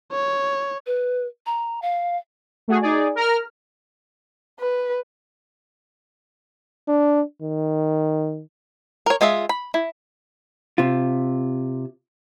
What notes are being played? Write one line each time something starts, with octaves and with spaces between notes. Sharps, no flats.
C#5
B4
A#5
F5
A3 F#4 G#4
D#4 G#4 D5
A#4 A#5 F6
B4
D4
D#3
A#4 C#5
G#3 F4 G#4 E5
B5
E4
C3 F4